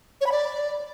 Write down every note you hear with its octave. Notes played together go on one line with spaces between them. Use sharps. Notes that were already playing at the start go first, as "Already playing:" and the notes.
C#5
B5
D5